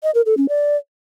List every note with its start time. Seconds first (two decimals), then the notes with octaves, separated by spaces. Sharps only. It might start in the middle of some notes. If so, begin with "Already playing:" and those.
0.03 D#5
0.15 A#4
0.26 A4
0.37 C#4
0.49 D5